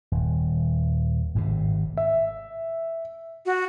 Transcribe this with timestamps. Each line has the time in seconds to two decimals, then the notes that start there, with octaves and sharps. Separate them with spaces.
0.12 D#1
1.35 G#1 A2 C3
1.97 E5
3.46 F#4